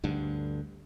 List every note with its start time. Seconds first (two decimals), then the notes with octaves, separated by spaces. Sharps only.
0.04 D2 G2 D3